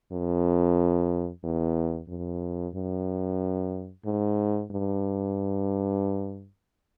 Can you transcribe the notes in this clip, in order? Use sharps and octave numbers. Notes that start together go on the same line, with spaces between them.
F2
E2
F2
F#2
G#2
G2